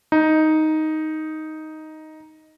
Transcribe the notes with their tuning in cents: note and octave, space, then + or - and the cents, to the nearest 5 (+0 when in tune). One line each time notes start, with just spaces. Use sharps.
D#4 +5